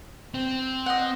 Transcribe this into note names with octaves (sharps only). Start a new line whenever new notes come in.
C4
D#5 F#5